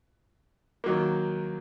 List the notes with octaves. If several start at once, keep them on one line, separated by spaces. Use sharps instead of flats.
D#3 F#3 A#3